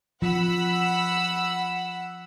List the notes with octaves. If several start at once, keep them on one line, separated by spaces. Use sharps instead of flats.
F3 F#5 B5 E6